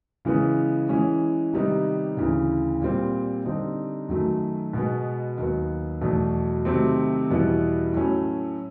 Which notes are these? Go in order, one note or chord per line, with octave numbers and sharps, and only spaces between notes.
C#3 E3 G#3 B3
E3 G#3 C#4
C3 D#3 G3 B3 D#4
D2 C#3 E3
A#2 G3 C4
D3 G3 C4 D#4
F#2 D#3 F#3 A3
B2 G#3 B3
D#2 D#3 F#3 B3
E2 B2 F#3 A3
C3 D#3 F#3 A3 C4
E2 B2 G3 B3 E4
A2 F#3 A3 C#4